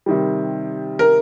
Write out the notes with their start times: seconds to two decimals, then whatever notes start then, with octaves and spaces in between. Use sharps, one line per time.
0.06 C3 D#3 G3
0.99 A#4